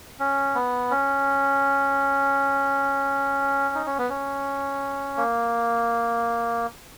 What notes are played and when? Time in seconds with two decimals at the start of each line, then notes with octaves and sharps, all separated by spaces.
0.20 C#4
0.55 B3
0.91 C#4
3.75 D#4
3.86 C#4
3.98 B3
4.10 C#4
5.17 A#3